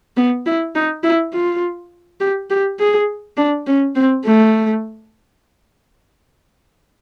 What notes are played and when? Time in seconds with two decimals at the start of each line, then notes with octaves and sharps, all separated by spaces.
0.17 B3
0.46 E4
0.75 D#4
1.04 E4
1.34 F4
2.20 G4
2.50 G4
2.79 G#4
3.37 D4
3.67 C#4
3.96 C4
4.25 A3